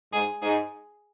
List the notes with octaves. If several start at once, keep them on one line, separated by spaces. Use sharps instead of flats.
G#2 G#4
G#2 G#4